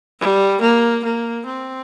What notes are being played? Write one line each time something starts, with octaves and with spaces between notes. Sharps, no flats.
G3
A#3
A#3
C4